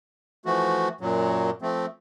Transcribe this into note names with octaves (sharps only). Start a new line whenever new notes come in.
E3 F3 A3 F#4
F#2 A#2 F#3
F3 A3 C4